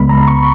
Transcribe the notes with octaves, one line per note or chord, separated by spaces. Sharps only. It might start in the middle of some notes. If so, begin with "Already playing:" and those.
Already playing: C#2 C#3 G#3 B3 B5
A#5
C#6